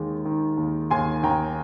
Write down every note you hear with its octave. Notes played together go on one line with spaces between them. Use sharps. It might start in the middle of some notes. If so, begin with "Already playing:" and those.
Already playing: D#2 D#3 G#3
D#3
D#2
D#2 G#5 C6
D#2 G5 A#5